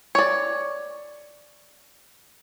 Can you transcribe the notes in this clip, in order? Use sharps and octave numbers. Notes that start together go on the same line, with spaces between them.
C#5 D5